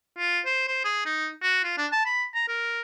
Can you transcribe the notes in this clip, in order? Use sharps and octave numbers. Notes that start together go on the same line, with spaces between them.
F4
C5
C5
G#4
D#4
F#4
F4
D4
A5
B5
A#5
A#4